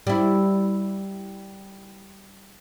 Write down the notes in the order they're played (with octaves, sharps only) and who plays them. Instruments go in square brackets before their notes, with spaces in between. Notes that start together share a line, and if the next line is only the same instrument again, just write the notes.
[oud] G3 E4